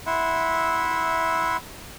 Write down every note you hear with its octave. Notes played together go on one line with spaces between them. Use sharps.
E4 E5 F#5 C6